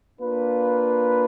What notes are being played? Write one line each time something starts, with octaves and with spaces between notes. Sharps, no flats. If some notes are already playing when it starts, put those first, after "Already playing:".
A#3 D4 F4 B4